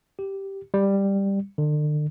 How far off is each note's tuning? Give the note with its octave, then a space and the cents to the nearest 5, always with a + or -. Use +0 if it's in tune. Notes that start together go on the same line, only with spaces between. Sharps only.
G4 -5
G3 +10
D3 +35